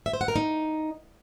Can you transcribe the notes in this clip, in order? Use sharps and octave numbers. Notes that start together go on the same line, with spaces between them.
E5
C5
F#5
A#4
D#4